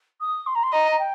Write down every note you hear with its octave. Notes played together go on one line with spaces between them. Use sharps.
D#6
C6
A#5
C6
D#5 A#5
A#5
G5